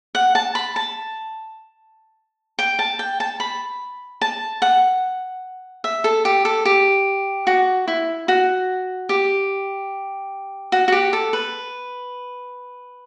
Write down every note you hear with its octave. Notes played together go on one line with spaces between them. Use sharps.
F#5
A5
B5
A5
G5
A5
G5
A5
B5
A5
F#5
E5
A4
G4
A4
G4
F#4
E4
F#4
G4
F#4
F#4
G4
A4
B4